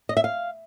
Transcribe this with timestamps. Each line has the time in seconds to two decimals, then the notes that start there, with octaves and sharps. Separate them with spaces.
0.09 D#5
0.17 E5
0.24 F5